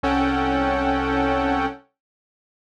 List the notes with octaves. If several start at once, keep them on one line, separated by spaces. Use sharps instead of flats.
C2 C#4 A4 F#5 G5